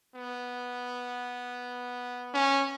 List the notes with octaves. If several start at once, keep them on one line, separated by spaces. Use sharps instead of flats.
B3
C#4